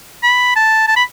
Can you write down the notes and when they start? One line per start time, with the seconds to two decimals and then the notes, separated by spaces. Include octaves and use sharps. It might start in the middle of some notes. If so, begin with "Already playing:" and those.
0.23 B5
0.56 A5
0.88 A5
0.96 B5